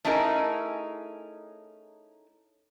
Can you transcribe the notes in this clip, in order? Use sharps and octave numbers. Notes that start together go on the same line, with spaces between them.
A3 C#4 D#4 E4 G#4 A#4